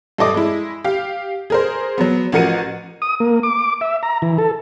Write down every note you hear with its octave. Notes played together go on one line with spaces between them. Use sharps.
G2 A4 D#5 D6
G#3 E4
G4 F5
G#4 A#4 C5
F#3 B3
A1 F3 F#4 A#4 C#7 D#7
D#6
A#3
D6
E5
A#5
E3
A4